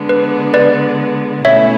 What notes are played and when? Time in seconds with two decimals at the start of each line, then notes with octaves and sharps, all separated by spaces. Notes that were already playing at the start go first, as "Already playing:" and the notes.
Already playing: D3 G#3 B3 D4
0.09 B4
0.54 B4 D5
1.45 B2 A3 C#4 E4 C#5 E5